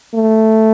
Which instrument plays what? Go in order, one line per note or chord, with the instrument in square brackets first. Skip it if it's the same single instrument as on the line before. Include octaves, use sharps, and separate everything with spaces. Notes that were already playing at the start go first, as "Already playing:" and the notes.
[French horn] A3